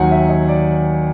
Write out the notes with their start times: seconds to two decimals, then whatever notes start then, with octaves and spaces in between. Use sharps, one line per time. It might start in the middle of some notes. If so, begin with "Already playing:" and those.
Already playing: D#2 D#3 F#3 F#5 G#5
0.11 E5
0.29 D#5
0.49 D5